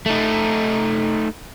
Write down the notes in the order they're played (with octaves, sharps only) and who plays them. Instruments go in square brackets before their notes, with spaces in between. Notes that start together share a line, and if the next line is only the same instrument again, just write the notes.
[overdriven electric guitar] A3 D#4